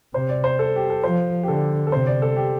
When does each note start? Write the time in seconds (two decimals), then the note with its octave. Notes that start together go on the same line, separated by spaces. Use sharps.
0.14 C3 C5
0.29 D5
0.44 C5
0.59 A4
0.76 G4
0.90 A4
1.03 F3 C5
1.43 G4
1.48 D3 A4
1.87 A4
1.92 C3 C5
2.07 D5
2.22 A4
2.37 G4